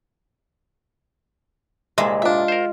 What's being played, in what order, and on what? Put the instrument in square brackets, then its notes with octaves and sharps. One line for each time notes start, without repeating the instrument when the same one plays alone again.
[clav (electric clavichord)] C2 G2 A#2 [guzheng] G#3 [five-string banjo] E5
[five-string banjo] D4 E5 [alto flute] F4
[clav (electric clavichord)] A#4 C5